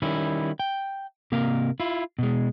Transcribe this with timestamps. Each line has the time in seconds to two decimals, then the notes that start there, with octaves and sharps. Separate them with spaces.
0.02 D#3 G3 C#4 E4
0.60 G5
1.32 C3 A#3 A#4 F5
1.80 E4 F4
2.19 B2 G#3